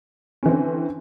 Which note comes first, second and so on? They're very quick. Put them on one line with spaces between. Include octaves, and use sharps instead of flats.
C#4 E3 C4 D3